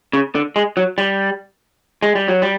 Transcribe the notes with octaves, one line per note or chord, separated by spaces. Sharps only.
C#3
D3
G#3
F#3
G3
G#3
G3
F#3
G3